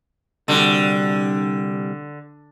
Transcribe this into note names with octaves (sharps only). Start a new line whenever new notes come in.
C2 D3 G3 F#4